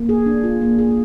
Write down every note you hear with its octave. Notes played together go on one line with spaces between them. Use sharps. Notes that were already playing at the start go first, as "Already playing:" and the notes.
Already playing: A#3
G#4
D4
F4
A#3
G#4